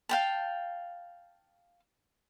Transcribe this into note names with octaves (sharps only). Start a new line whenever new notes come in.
F5 G5 A5